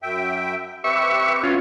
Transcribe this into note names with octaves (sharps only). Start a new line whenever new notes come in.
F#2 E5 G5
C4 G4 B4 E5 C#6
B2 C#4 F4